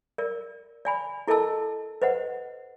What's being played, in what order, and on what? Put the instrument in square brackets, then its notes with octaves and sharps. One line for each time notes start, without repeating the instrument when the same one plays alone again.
[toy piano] A#4 D5
D5 G#5 B5
E4 A4 A#4 D#5 A5 E6
B4 C5 D#5 F#5